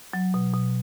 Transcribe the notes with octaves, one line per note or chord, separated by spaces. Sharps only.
F#3
B2
B2